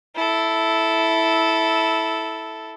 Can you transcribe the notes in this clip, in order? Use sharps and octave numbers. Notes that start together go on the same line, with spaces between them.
E4 A4